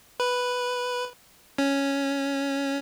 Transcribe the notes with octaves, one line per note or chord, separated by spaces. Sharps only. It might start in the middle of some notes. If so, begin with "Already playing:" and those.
B4
C#4